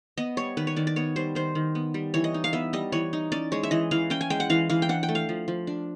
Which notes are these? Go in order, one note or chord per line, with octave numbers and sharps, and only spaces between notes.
B3 D#5
G3 C#5
D#3 B4
C#5
D#3 D5
D5
B3 C#5
G3 C5
D#3 C5
D#3
B3
G3
E3 C#5
D#5
D#4
F5
B3 E5
G3 D#5
E3 C#5
D#4
C#4 D5
G#3 C#5
E5
E3 D#5
E3 F5
C#4 G5
G#5
G#3 G5
F#5
E3 F5
E3 F5
G5
D4 F#5
G5
A3
F5
F3
F3
D4